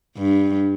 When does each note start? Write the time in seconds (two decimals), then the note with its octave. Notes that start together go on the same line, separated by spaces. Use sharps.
0.17 G2